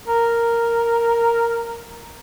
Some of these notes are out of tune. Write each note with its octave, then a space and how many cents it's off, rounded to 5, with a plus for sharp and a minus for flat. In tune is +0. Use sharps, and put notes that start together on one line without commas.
A#4 -5